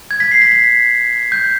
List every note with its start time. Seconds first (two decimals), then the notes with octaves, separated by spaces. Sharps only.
0.11 G#6
0.20 B6
0.31 C7
0.42 B6
0.52 B6
1.32 G6